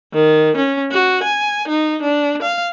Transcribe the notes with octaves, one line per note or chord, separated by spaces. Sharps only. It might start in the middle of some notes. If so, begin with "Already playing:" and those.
D#3
C#4
F#4
G#5
D#4
D4
F5